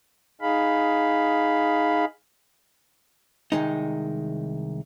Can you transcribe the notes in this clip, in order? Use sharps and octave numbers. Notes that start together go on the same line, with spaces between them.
D#4 G#4 F5 B5
C2 D#3 G#3 D#4